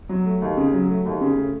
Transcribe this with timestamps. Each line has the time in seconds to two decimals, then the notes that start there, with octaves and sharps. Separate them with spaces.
0.09 F#3
0.26 A3
0.42 D#2
0.57 C#3
0.73 F#3
0.90 A3
1.06 D#2
1.21 C#3
1.37 A3